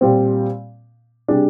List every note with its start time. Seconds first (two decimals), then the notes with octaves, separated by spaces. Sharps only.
0.01 A#2 G3 C4
1.28 C3 G3 D4 G#4